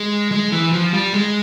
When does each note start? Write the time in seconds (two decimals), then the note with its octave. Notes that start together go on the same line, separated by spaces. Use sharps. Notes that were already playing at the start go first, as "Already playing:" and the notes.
Already playing: G#3
0.31 G#3
0.52 E3
0.73 F3
0.93 G3
1.14 G#3